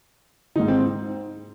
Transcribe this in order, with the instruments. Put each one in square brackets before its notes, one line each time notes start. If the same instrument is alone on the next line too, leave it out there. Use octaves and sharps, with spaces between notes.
[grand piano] G#2 D#3 D#4
C4